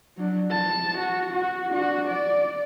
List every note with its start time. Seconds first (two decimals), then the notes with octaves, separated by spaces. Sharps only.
0.17 F#3 D4
0.52 A5
0.98 F#4
1.32 F#4
1.70 D4 F#4
2.08 D5